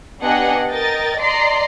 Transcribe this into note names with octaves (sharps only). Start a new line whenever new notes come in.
B3 D4 G4 D#5 F#5 G#5
A#4 D#5 G5 A6
D5 D#5 A#5 C6 C7